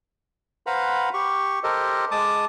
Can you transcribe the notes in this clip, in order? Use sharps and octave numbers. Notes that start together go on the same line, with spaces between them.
B4 C5 F5 F#5 A#5 B5
G4 C#6
G4 A4 A#4 C5 D#5
G#3 A5 D6 D#6